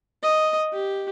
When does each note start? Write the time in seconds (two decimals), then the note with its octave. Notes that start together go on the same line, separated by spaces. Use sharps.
0.23 D#5
0.72 G4